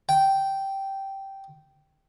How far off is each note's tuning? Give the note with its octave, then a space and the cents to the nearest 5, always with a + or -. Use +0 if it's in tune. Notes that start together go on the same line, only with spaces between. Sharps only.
G5 -10